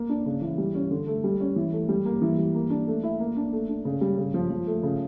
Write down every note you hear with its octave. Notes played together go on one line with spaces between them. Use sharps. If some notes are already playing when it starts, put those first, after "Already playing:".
Already playing: A#3
D4
C#3
E3
G3
C#4
D3
A3
G3
C#4
E3
A3
G3
A#3
E3
G3
A#3
D4
A3
E4
A#3
D4
A3
D4
C#3
G3
C#3
F3
F3
A3
C#3